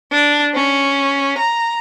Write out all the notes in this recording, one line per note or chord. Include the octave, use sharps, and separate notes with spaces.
D4
C#4
A#5